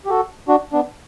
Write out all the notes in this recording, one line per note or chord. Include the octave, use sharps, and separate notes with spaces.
G4
F#4 A4
D4 F#4
B3 D4